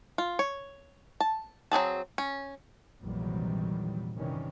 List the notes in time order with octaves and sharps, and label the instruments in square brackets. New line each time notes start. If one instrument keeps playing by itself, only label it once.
[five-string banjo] F4
C#5
A5
F#3 C4 G#4 A5
C#4
[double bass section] A#1 E2 C3 D#3 F#3 G3
G2 C3 D#3 E3 C#4